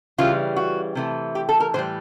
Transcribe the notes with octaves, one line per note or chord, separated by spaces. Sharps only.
C#3 E3 G3 F4
F#4
C3 E3 A3
G4
A4
A#4
A2 E3 G3 C5